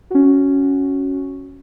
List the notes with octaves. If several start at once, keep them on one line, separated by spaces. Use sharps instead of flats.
C#4 F#4